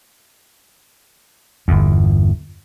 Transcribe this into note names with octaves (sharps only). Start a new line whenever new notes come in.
G1 E2